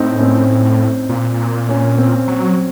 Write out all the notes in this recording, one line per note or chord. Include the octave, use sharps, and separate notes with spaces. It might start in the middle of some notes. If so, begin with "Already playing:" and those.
Already playing: A2 C4 D#4
C#4
C4
A#2
C#4
C4
F#3